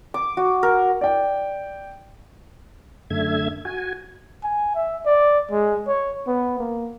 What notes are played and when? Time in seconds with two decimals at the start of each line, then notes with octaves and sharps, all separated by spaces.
0.14 D6
0.37 F#4
0.63 A#4
1.01 D5 G5
3.10 F#2 D3 A3 E5 G#6
3.65 F#4 G#5
4.44 G#5
4.75 E5
5.06 D5
5.51 G#3
5.88 C#5
6.27 B3
6.59 A#3